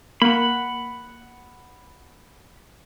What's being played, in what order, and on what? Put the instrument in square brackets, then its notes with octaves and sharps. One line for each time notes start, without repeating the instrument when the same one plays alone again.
[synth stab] A#3 [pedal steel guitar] F#5 B5